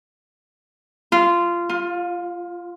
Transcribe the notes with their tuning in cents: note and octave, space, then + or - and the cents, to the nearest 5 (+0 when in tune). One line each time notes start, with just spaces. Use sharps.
F4 -15
F4 +20